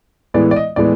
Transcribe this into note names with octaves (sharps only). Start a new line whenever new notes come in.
A2 E3 G#3 B3 D5
D5
D#5
A2 E3 G#3 B3 D5